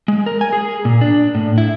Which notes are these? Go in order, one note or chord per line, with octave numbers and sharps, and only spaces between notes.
G#3
A#4
G#5
G#4
A#2
D4
A2
E4